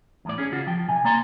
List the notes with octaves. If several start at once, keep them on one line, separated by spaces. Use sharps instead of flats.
E2 A2 D5
C#4 G#4
C#3 F4 F#4
F3 G5
C3 G#5
A#3 D5 A#5 C6